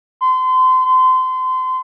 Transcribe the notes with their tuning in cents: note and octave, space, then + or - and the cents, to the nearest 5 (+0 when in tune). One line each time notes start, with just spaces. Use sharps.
C6 -30
C6 -30